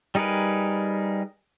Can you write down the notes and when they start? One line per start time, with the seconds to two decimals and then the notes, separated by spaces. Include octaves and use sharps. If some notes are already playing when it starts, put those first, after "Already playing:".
0.15 G3 D#4 G#4 A#4 B4